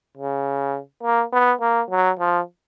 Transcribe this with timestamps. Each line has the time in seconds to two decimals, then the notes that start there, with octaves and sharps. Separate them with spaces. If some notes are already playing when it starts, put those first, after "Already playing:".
0.18 C#3
1.04 A#3
1.33 B3
1.61 A#3
1.91 F#3
2.20 F3